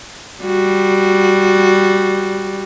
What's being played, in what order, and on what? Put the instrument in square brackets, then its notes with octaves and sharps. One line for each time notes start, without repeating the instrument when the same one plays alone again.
[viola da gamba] G3 F#4